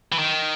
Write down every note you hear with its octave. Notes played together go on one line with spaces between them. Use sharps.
E3
D#3